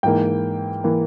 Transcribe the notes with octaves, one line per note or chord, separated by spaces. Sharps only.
G#2 E3 A#3 G5
E3 A#3